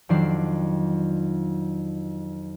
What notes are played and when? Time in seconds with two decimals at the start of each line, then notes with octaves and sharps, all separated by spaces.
0.09 F2 D#3 F#3 D4 D5 C7